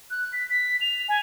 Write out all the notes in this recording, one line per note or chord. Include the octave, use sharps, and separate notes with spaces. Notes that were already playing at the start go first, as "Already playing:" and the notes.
F#6
B6
B6
F7
G#5